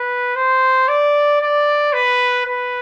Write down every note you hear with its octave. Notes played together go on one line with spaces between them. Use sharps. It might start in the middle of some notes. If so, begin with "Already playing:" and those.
Already playing: B4
C5
D5
D5
B4
B4